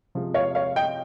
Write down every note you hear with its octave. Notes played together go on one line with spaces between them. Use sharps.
C3 F3 G#3
C#5 F5
C#5 F5
D#5 G5